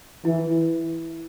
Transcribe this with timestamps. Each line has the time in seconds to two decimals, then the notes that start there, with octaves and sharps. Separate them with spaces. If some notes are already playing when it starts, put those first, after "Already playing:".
0.25 E3 E4